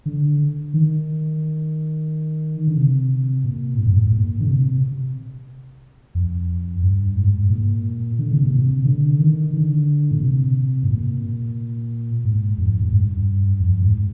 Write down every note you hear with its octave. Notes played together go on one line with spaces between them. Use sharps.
D3
D#3
D3
C3
A#2
G#2
G2
G#2
G#2
A#2
D3
C3
F2
G2
G#2
A#2
D3
C3
A#2
C3
D3
D#3
D3
A#2
C3
G#2
A#2
G#2
F2
G#2
G2
F2
G#2